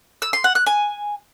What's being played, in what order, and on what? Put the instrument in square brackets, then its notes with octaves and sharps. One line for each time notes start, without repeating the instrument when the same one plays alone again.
[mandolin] E6
C6
F#5
F#6
G#5